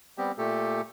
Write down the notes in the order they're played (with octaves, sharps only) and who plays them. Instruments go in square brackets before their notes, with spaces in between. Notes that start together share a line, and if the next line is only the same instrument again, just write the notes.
[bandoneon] G3 B3 C4 G4
A#2 A3 G4 A4